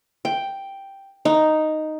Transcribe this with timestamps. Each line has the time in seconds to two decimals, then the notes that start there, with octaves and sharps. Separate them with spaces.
0.25 G5
1.25 D#4